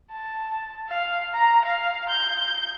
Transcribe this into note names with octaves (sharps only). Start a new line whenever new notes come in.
A5
F5
A#5
F5
G6